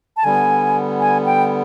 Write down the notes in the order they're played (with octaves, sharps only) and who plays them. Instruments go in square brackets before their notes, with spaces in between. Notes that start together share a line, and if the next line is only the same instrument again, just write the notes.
[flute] A5
[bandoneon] D3 G3 B3 [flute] G#5
[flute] G#5
G5